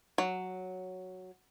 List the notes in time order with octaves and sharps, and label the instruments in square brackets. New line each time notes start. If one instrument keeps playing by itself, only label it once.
[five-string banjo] F#3